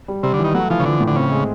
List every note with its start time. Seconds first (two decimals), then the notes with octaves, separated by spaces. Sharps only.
0.08 G3
0.23 C3 G3
0.34 D3
0.39 E3
0.44 D#3
0.54 F#3 A3
0.70 E3 F3
0.80 C#3
0.85 D3 F3
1.00 A2
1.08 D3
1.16 C#3 C4
1.31 G#3